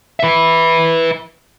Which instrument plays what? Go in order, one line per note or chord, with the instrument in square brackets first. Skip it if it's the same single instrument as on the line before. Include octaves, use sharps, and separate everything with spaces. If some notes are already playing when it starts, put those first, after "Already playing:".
[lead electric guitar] B4 E5